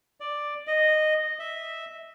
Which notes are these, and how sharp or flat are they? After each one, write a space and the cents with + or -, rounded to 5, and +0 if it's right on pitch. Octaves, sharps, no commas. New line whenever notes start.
D5 +5
D#5 -10
E5 -10